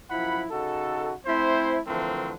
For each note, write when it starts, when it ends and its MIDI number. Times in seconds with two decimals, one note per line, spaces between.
0.11 0.44 42
0.11 0.44 53
0.11 0.44 64
0.11 0.44 78
0.11 0.44 83
0.51 1.13 49
0.51 1.13 63
0.51 1.13 66
0.51 1.13 69
1.27 1.78 57
1.27 1.78 60
1.27 1.78 64
1.27 1.78 72
1.87 2.33 50
1.87 2.33 52
1.87 2.33 53
1.87 2.33 57
1.87 2.33 60
1.87 2.33 70